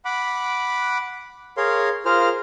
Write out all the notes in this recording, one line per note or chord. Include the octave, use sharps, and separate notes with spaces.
F#5 B5 D6
G#4 A#4 C#5 F5 C6
F4 G#4 A#4 C5 F5 F6